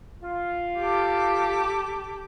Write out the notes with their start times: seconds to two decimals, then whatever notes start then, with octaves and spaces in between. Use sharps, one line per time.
0.23 F4
0.80 G4 A4 D6